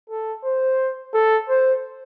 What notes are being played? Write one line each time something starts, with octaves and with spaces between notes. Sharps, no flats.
A4
C5
A4
C5